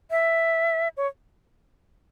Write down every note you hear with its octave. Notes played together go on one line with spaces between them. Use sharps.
E5
C#5